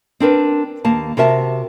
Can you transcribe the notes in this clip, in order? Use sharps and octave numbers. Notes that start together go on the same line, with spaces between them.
C4 D4 A#4 B4
D#2 A#3 A5
C3 F#4 A#4 E5 A5